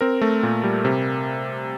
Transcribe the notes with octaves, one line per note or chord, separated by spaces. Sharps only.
C4 A#4
A3
A#2
G3
C3